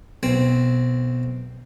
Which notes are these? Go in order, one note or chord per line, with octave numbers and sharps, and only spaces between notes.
B1 C4